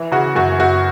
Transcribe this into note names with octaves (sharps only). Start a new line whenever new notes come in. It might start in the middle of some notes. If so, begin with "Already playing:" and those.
Already playing: E3
C#3 F#4
F#2 F#4
F#2 F#4